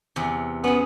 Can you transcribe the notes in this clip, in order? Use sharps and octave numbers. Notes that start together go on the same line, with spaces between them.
E2 C3
B3 C#4 G#4